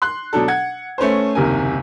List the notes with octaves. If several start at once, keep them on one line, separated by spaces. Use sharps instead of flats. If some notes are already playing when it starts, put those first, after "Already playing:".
C6 F#6
B2 F#3 D4 A4
F#5 G#6
A3 C#4 B4 C5
F#1 D#2 C3 A#4 G#5